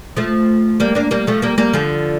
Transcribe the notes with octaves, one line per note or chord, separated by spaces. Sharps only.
F3 A3
G3 A#3
A#3 D4
G3 A#3
F3 A3
G3 A#3
G3 A#3
D3 F3